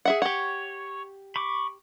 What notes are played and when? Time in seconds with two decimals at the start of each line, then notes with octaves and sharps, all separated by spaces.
0.05 G#4 E5 F#5
0.22 G4 C#5 F#5
1.36 B5 C#6 D6